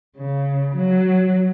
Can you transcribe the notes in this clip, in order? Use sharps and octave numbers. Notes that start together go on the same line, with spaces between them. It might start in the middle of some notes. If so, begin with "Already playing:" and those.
C#3
F#3